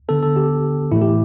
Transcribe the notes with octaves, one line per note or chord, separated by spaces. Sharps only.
D3 B3 A4
A4
G4
A2 E3 A3 E4
G4